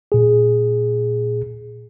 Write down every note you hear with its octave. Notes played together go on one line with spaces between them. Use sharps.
A#2 G#4